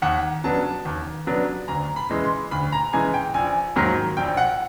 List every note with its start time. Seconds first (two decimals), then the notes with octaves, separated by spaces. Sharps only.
0.02 D#2 F#5
0.44 C#3 F#3 B3 D4 A5
0.85 D#2
1.27 C#3 F#3 B3 D4
1.68 D2 A#5
1.96 B5
2.09 C#3 E3 G#3
2.24 C6
2.51 D2 B5
2.72 A#5
2.93 C#3 E3 G#3 G#5
3.14 G5
3.34 A#1 G#5
3.76 G#2 D#3 F#3 A#3
4.17 A#1 G5
4.37 F#5